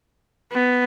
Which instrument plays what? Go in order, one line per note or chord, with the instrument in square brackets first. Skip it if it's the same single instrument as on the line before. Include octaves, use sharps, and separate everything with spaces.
[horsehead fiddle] B3